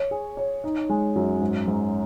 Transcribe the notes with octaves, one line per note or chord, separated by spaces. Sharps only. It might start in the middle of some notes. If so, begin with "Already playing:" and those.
Already playing: C#5
G#4
C#5
D#4
G#3
F#2
G#2
G#2